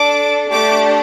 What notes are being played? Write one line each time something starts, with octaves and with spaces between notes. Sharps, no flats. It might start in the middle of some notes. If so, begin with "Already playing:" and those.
Already playing: D4 A4 D6
A3 D4 G4 D6